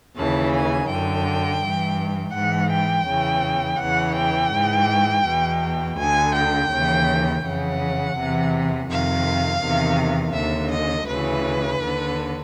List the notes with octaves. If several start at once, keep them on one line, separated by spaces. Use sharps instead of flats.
D#2 C#3 E3 A5
G#5
F#2 D3 G5
G2 E3
G#2 E3 F#5
G5
E2 C#3 E3
E2 C#3 E3 F#5
G5
G#2 E3
E2 B2
D2 D3 G#5
G5
D#2 C#3 E3
F2 C#3 E3 F#5
E2 C3 E3
F2 C3 D#3 F5
E2 C3 D#3
D#2 D3 E5
D#5
D2 C#3 E3 B4
D#2 D3